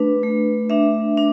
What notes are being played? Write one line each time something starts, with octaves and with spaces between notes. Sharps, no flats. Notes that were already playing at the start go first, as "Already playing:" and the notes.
Already playing: A3 D4 B4
A3
D4 E5
D4